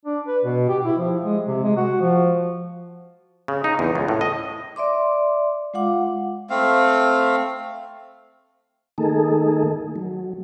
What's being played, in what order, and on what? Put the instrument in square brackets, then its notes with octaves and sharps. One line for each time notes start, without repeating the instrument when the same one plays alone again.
[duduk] D4
B4
B2
G4
E4
F3
G#3
C3
G#3
F#4
F3
[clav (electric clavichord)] C#3
D#4
E2
C#2
A2
D#5
[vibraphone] D5 E5 C6 D6
G#3 F4 F5 F#5 D6
[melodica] A3 C4 F5
[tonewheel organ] D#3 A3 A#3 D#4 G#4 A4
F#3